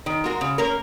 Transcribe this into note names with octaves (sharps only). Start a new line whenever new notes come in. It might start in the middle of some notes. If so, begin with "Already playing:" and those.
D#3
G#3 F#4 A#4
C#3
A#3 C#4 A#4